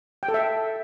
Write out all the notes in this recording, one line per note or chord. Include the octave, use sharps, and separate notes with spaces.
G5
A4
E5